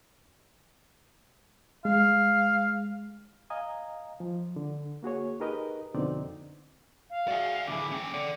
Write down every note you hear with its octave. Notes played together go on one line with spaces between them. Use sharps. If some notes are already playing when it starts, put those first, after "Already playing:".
G#3 F5
D#5 F5 G#5 A#5 D#6
F3
D3
A#3 F#4 G#4 C#5
D#4 G4 G#4 A#4 B4 D#5
F2 B2 D3 C4 D#4 D5
F5
F#4 G#4 D5 E5
E2 D3 E4 G#4 D6
C#4 G5 D6
A4 D5 F#5